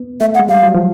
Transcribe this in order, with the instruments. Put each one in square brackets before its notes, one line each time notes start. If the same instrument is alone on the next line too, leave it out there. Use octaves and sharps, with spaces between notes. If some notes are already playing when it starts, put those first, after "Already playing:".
Already playing: [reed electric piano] B3
[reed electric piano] A3 [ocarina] E5
[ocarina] F#5
[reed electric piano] G#3
[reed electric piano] G3 [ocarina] F5
[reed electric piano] F#3
F3